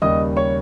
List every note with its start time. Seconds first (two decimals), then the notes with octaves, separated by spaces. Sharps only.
0.02 D#2 C#3 G3 D#5 D#6
0.37 C#5 C#6